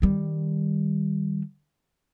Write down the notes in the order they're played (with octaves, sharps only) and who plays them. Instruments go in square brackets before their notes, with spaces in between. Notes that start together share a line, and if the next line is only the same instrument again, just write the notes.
[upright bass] D#3 G3